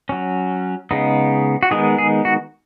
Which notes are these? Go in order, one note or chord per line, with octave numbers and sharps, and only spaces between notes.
F#3 C#4
C#3 G#3 B3 D#4
F#4
D#3 G#3 B3 D#4 G#4
G#4
F#4